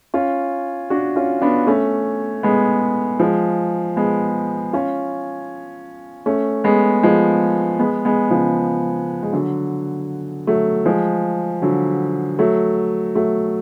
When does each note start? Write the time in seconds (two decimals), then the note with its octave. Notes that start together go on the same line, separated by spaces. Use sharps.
0.14 C#4 F4
0.90 D4 F#4
1.16 C#4 F4
1.42 B3 D4
1.67 A3 C#4
2.43 G#3 B3
3.20 F3 G#3
3.96 G#3 B3
4.73 C#4 F4
6.26 A3 C#4
6.64 G#3 B3
7.03 F3 G#3
7.79 G#3 B3
8.05 G#3 B3
8.31 C#3 F3
9.23 G#3
9.33 D3 F#3
10.47 F#3 A3
10.85 F3 G#3
11.62 D3 F#3
12.39 F#3 A3
13.16 F#3 A3